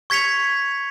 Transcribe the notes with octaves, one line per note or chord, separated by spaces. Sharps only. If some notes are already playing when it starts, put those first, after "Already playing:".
C#6 G#6 B6 C#7 F7